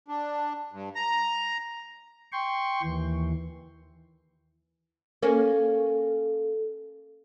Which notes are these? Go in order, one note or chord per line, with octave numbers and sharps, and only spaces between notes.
D4
G2
A#5
G5 C6 C#6
D#2 E3
A#3 C#4 A4